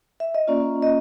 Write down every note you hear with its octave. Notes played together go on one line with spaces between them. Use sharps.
E5
D#5
A#3 C#4 F4 D5
D#5